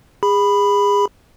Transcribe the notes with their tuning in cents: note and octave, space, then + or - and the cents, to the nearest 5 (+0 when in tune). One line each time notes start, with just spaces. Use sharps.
G#4 -30 B5 +0